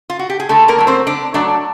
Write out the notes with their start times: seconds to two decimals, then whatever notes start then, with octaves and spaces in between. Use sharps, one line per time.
0.10 F4
0.19 F#4
0.30 G4
0.40 G#4
0.49 D3 A3 A4
0.68 A#3 A#4
0.79 F#3 A3
0.87 C4 C5
1.07 D3 D4 D5
1.34 F#3 A3 D4 D5